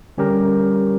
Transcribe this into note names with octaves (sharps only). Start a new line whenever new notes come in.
D3 G3 C#4 G4 A#4